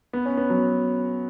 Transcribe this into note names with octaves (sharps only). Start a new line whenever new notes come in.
B3
C#4
B3
F#3